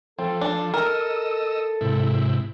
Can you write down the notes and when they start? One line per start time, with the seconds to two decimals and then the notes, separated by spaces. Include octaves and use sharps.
0.19 F3 C4 A4
0.41 D4
0.74 A#4 D#5 E6
1.81 G#2 C3 E4